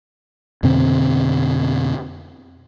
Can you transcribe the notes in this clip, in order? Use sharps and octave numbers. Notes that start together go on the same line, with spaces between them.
F2 B2 D3 C4